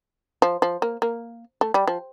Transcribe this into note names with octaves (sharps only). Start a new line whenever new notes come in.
F3
F3
A#3
A#3
A3
G3
F3